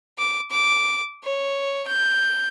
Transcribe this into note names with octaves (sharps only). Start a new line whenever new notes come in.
D6
D6
C#5
G6